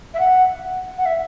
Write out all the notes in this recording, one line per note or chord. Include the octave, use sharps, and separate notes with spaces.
E5
F#5
F#5
E5